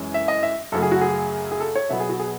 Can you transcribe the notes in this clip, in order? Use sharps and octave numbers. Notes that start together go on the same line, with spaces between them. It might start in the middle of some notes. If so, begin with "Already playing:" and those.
Already playing: F#2 E3 G#3 C#4
E5
D#5
E5
F#2 C#3 F#3 A3 A4
G#4
F#4
G#4
G#4
A4
C#5
B2 F#3 B3 E5
G#4
F#4
G#4